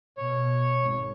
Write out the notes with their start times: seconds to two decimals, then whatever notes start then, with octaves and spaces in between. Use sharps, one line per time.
0.17 B2 C#5
0.82 G#1